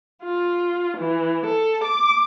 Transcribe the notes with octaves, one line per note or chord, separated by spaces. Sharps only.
F4
E3
A4
D6